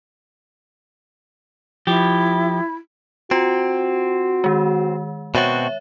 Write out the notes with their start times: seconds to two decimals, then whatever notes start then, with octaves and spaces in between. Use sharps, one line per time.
1.87 F3 E4 G4
3.31 C4 F4 F#4
4.44 D#3 G#3
5.35 B2 C4 F#4 C#5 E5